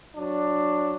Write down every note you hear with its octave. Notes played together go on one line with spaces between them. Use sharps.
F#3 D4